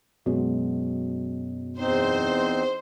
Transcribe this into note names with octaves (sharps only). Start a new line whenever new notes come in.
F#2 B2 F#3 G#3
E2 C4 D#4 C5